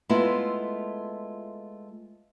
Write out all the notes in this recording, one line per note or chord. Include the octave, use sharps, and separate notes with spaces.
G#3 A3 B3 E4 F4 A4